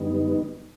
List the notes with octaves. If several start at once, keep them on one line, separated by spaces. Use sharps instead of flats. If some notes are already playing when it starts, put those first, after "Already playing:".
Already playing: F#2 D3 G3 B3 D#4